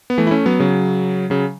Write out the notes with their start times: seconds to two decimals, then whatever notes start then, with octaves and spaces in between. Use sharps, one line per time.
0.10 B3
0.18 E3 A3
0.27 E4
0.31 A3 C#4
0.46 F#3 B3
0.60 C#3 F#3
1.30 C#3 F#3